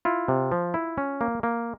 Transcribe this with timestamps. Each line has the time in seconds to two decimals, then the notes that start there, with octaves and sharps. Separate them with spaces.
0.05 E4 F4
0.28 C3
0.52 F3
0.74 E4
0.98 C#4
1.21 A#3
1.43 A#3